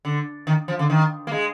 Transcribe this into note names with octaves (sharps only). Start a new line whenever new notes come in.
D3
D#3
F3
D3
D#3
A#3
G#3